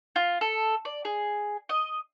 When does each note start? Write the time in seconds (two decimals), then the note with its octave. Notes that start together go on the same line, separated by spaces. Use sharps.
0.16 F4
0.41 A4
0.85 D5
1.05 G#4
1.69 D#5